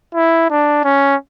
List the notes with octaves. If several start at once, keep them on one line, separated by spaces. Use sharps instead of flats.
E4
D4
C#4